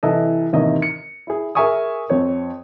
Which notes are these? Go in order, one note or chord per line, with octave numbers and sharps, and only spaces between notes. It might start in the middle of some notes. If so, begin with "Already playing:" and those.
C2 E3 E4 A4 D#5
A1 D#2 C3 A#3 D#5 E5
C#7
E4 G#4
G#4 A#4 E5 G#5 C#6 D#6
F2 C4 C#5